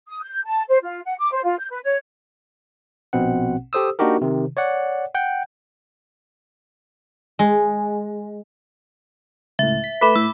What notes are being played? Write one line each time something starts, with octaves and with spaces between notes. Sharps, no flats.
D#6
G6
A5
C5
F4
F#5
D6
C5
F4
G6
B4
C#5
A#1 B2 C4 F#5
G4 A4 C5 D#6 E6
A#3 D4 D#4 F#4 G4 A#4
C3 D#3
C#5 D5 F#5
F#5 G5 G6
G#3
C#2 A2 E5
B6
A3 B4 B5 D6 B6
A2 E6